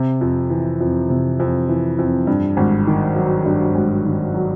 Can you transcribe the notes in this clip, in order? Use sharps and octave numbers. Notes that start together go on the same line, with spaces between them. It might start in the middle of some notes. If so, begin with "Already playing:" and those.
Already playing: C3
F2
E3
F2
C3
F2
E3
F2
G2
G#1
D#3
F#3
G2
G#1
D#3
F#3